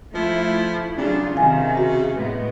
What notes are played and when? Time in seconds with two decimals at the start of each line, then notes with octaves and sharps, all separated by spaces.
0.15 F3 A3 E4
0.98 C#3 F#3 D4 F4
1.37 C3 D#3 F5 G#5
1.77 F#4
2.13 A2 G#3 B3